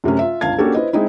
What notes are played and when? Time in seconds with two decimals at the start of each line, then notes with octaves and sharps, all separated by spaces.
0.04 F#2 C3 A3 C#4
0.19 F4 E5
0.41 G1 C#2 F5 A5 G#6
0.58 A#3 C#4 D4 F#4 G4 A4
0.74 E4 B4 C5 D#5
0.93 G#3 C4 D#4 E4